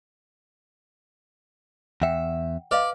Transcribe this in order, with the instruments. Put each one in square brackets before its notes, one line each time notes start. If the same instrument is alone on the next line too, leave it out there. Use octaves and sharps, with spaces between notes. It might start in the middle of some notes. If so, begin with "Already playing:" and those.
[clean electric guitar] E2 E5 [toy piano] F#5 G5
[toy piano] B4 D#5 F5 [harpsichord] D5